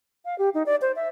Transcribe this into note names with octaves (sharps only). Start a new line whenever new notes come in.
F5
G4
D#4
D5
C5
E5